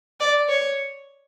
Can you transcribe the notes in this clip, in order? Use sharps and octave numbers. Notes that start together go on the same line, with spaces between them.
D5
C#5